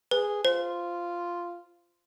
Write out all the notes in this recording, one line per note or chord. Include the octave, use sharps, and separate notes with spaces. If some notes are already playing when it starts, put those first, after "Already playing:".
G#4 B4
F4 C5